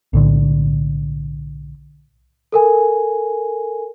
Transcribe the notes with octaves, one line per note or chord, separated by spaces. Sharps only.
B1 A2 D3
A4 A#4 G#5